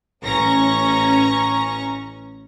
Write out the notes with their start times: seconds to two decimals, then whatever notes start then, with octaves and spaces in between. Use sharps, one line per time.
0.22 A1 C#4 A#5 C#6 A#6